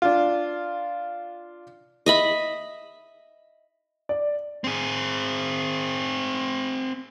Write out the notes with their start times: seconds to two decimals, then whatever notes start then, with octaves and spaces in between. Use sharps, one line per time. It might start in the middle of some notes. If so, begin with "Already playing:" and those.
0.02 D4 F4
2.06 D#5 E5 B5
4.09 D5
4.64 C4 G#4